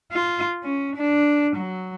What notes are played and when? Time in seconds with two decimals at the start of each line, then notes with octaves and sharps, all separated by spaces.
0.12 F4
0.63 C#4
0.96 D4
1.56 F#3